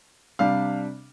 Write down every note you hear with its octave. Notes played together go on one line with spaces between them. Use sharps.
C3 G3 D4 F5